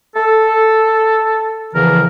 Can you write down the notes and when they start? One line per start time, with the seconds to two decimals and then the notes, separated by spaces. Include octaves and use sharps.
0.15 A4
1.74 E2 C#3 E3 F3 A#4